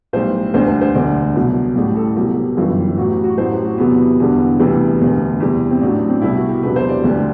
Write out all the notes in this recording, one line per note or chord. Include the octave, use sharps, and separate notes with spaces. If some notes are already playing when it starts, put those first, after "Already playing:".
B1 A2 G3 C5
E1 D2 D3 G3 C5
C5
C5
E1 D2 D3 D5
C2 B2 F#3
A1 A2 G3
A4
C2 B2 F#3 G4
G1 F#2 E3 G3
A1 A2 F#3 F#4
G4
F#4
A1 A2 F#3 C5
G4
F#4
E2 C3 F#3 B3
E1 E2 D3 G3
D2 C3 E3 G3 B3
E1 D2 D3
E2 C3 G3
C4
A1 A2 F#3 D4
C4
C2 B2 G3 E4
F#4
G4
E1 E2 C3 F#3 B4
C5
D5
D2 D3 G3